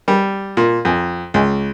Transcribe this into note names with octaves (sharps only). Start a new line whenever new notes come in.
G3
A#2
F2
C#2